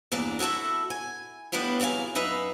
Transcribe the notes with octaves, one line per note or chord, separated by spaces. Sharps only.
E2 G2 A#3 D4 D5
E4 F#4 G4 A4 E5
G#5
A2 G3 B3 D4 E4 F5
E2 C3 F#3 F5 G#5
F#2 D#4 B4 E5 F5